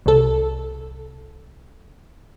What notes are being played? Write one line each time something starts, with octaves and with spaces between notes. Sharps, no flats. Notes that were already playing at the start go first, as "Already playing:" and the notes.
C2 A4